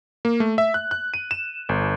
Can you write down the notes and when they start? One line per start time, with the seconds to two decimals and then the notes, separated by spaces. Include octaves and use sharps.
0.25 A#3
0.40 A3
0.58 E5
0.74 F#6
0.91 F#6
1.14 D#7
1.31 E7
1.69 G1